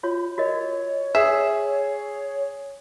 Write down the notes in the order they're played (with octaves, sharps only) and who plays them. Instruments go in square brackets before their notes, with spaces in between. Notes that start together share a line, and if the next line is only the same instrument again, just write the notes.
[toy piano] F4 F#4 C#5
[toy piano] F#4 A#4 D#5 [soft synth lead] C#5
[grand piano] G#4 [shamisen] E5